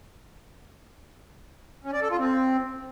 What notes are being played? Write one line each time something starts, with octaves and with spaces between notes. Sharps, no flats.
C#4
D5
A4
F4
C4